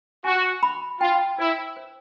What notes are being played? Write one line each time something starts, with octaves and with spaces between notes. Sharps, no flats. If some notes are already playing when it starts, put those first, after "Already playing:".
F#4 G#5
B5
F4 G5
E4 C5
C5